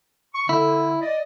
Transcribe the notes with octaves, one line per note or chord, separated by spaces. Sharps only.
C#6
D3 E4
D5 D#5